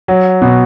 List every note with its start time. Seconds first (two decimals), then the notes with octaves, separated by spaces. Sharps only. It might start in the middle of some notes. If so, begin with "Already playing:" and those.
0.08 F#3
0.42 B2